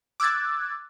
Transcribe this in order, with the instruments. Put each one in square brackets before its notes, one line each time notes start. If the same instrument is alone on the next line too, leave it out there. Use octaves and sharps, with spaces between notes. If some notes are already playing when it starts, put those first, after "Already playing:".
[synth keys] D6 E6 F#6 G#6 A6